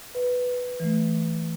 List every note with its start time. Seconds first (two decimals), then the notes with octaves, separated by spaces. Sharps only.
0.15 B4
0.80 E3 A3